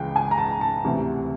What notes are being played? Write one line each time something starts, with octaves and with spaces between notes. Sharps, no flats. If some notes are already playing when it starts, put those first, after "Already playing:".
Already playing: C#2 C#3 E3 G5
G#5
A#5
A5
A5
D2 C3 E3